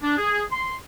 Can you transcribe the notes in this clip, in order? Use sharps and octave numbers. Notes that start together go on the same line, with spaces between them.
D4
G#4
C6